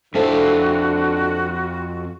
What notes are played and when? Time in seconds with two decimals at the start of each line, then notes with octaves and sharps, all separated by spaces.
0.14 F2 D3 C4 E4 F#4 A4 E5 F5